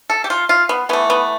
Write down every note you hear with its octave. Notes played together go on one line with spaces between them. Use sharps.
A4
G4
F4
F4
B3
E3 A3 B3
B3